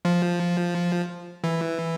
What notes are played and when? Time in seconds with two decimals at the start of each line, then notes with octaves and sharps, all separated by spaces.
0.05 F3
1.44 E3